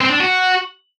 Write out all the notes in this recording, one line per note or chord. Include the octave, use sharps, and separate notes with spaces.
C4
D4
F#4